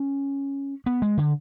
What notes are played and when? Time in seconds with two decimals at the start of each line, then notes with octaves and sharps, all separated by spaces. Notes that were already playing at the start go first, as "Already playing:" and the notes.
Already playing: C#4
0.86 B3
1.02 G#3
1.18 D3